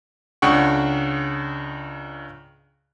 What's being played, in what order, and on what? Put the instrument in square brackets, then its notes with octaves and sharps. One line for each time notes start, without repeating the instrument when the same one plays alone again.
[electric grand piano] C#2 C#3 D4 F#5 G5 C#6